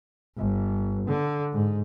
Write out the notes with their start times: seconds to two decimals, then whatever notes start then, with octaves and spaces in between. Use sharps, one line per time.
0.37 G1
1.07 D3
1.53 G#2